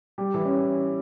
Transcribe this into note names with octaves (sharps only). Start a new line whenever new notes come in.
G3 G4
E3 E4
C#4